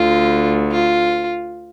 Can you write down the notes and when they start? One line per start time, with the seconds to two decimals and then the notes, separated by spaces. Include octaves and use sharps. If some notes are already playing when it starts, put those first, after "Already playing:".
Already playing: D2 D3 F4
0.71 F4